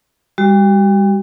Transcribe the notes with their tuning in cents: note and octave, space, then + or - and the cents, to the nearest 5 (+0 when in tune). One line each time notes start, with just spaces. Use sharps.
G3 +35 F#4 +40